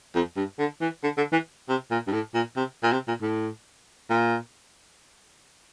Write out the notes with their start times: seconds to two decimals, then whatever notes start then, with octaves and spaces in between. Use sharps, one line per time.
0.15 F2
0.36 G2
0.59 D3
0.81 E3
1.03 D3
1.17 D3
1.32 E3
1.69 C3
1.91 A#2
2.07 G2
2.13 A2
2.34 A#2
2.56 C3
2.83 A#2
2.93 C3
3.08 A#2
3.22 A2
4.10 A#2